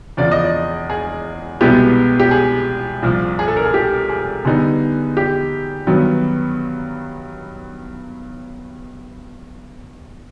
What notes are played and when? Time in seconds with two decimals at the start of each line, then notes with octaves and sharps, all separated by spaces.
0.17 E2 C#3 F3 D5
0.31 D#5
0.44 D5
0.90 G#4
1.61 C2 B2 G#3 B3 E4 G4
2.20 G4
2.31 G#4
3.02 C2 A#2 F3
3.39 G#4
3.48 A4
3.57 A#4
3.64 G#4
3.74 G4
4.10 G#4
4.45 D3 G3 B3 D#4 G#4
5.17 G4
5.87 G2 D#3 F#3 B3